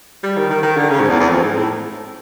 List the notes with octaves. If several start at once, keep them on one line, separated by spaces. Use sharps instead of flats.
G3
D#3
D#3
D#3
D3
C#3
G#2
E2
E2
F2
G#2
A2